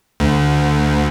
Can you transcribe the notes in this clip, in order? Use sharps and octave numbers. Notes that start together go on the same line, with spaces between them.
D2